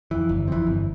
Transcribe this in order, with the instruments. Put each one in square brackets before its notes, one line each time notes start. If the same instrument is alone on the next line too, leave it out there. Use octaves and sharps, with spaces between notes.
[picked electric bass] F2 E3
G1
F2 E3
G1